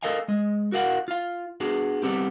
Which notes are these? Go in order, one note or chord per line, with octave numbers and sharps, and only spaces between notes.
A4 A#4 D#5 F5 G#5
G#3 D#5
F#4 A#4 F5 F#5
F4 F5
B3 D4 F#4 G#4
G3 B3 C4 G4